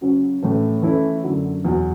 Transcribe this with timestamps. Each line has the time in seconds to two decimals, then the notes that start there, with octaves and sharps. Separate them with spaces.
0.01 C#3 F#3 C#4
0.43 A2 E3 A3 C#4
0.82 E3 A3 C#4 E4
1.24 F#2 D3 F#3
1.65 E2 B2 F#3